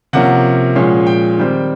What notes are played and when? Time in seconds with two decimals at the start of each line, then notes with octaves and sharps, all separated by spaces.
0.13 C3 F3 A#3 C#4 F#5
0.75 A#2 F3 G#3 C#4
1.07 G5
1.37 D#3 G3 C4